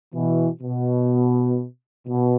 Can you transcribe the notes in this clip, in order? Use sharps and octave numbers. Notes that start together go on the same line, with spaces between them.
B2 E3
B2
B2